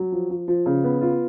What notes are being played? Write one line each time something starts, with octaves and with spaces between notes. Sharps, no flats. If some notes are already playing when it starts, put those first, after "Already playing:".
Already playing: F#3
F3
F3
F3
C#3
B3
F4